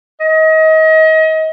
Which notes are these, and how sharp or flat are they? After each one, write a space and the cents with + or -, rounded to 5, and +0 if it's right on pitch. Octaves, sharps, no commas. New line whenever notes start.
D#5 +30